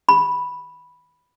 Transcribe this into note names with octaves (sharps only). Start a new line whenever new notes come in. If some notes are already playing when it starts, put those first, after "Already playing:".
B5